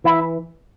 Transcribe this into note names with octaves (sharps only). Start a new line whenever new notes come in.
E3 E4